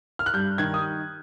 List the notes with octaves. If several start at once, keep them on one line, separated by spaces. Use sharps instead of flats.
F6
F#6
G2 G6
D#3 G#6
D#6